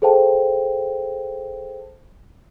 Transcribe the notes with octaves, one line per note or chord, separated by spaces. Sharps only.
G#4 A4 C5 F5 G5 A5